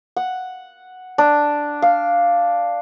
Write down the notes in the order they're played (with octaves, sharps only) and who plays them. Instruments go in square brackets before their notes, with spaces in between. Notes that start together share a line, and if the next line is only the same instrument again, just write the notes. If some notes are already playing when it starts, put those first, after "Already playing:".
[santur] F#5
D4
F5